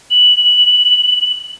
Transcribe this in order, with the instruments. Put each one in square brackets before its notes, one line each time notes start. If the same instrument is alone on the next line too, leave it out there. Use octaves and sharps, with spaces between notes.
[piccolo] F#7